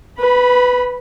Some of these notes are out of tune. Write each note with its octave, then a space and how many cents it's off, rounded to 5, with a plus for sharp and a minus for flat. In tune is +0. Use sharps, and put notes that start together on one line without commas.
B4 +10 B5 -20